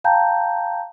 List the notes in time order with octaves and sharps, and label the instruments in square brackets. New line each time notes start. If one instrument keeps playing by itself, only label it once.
[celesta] F5 G5 A5 A#5 G6